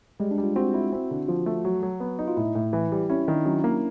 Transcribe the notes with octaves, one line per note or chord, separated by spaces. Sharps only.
G3 G#3
D4
G3
F4
C4 F#4
E4
C4
D3
F3 F4
A3
F#3 F#4
F#3
B3
D#4
F4
A2 E4
A2
E3
G3
C#4 E4
D#3 D4
F#3 C#4
A#3